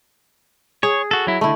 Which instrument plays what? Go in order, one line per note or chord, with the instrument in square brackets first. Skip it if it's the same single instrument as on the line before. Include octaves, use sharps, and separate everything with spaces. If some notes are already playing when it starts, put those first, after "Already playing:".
[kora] G#4 [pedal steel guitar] C#5
[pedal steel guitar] F#4 A4
F#3 E4
[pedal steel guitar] D3 [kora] A3 E4